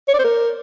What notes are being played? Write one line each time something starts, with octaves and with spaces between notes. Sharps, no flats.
C#5
D5
C5
A#4